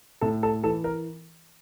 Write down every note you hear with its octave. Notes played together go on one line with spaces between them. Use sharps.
A2 A4
A4
E3 A4
A#4